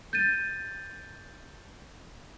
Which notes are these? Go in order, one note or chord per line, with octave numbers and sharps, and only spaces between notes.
G6 A6 D#7